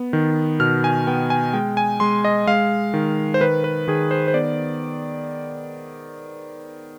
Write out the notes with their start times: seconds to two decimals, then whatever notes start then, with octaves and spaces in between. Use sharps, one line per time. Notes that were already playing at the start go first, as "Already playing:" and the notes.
Already playing: B3
0.13 D#3
0.60 B2 F6
0.84 G#5
1.07 B3 G5
1.30 G#5
1.53 G#3 G5
1.77 G#5
2.00 G#3 C6
2.25 D#5
2.47 G#3 F5
2.94 D#3
3.34 C5
3.41 D#3 B4
3.64 B4
3.88 D#3 G#4
4.11 C5
4.28 C5
4.34 B3 D5